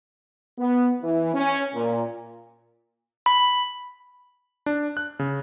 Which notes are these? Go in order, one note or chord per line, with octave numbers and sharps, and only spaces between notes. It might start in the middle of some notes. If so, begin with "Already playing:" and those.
B3
E3
C#4
A#2
B5
D4
F#6
C#3